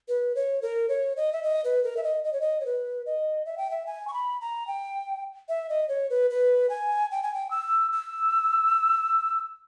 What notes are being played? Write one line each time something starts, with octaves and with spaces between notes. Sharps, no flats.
B4
C#5
A#4
C#5
D#5
E5
D#5
B4
A#4
E5
D#5
D#5
C#5
D#5
C#5
B4
D#5
E5
G5
E5
G#5
C#6
B5
A#5
G5
E5
D#5
C#5
B4
B4
G#5
G5
G#5
G5
E6
E6